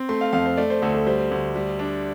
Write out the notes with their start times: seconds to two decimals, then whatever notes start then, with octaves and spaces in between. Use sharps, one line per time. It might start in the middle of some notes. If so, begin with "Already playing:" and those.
Already playing: C4
0.09 A3 C6
0.21 F5
0.33 F2 F5
0.45 C5
0.57 A3 D5
0.70 C5
0.82 D2 A4
0.94 A4
1.06 G3 C5
1.31 D2
1.56 G3
1.79 D4